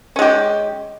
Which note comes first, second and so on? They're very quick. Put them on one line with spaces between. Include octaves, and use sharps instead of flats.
C#4 G#3 G4